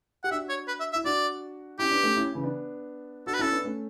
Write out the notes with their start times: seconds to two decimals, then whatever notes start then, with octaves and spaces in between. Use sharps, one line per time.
0.24 G4 F#5
0.31 D4 F#4 E5
0.49 C#5
0.68 B4
0.80 E5
0.93 E4 E5
1.04 D4 F#4 D5
1.79 C#4 E4 G4
1.91 B3 D4
2.03 A3 C#4
2.16 C#4 E4
2.35 C#3 E3
2.43 B3 D4
3.27 D4 F#4 A4
3.34 B4
3.39 C#4 E4 A4
3.52 B3 D4
3.64 A3 C#4